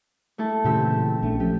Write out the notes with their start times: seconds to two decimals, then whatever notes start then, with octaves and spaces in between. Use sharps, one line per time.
0.38 A3 E4 A4
0.64 A#2 C#3 E3 C4 G4 E6
1.22 A#1 A3 D4
1.40 F3 C#4 G4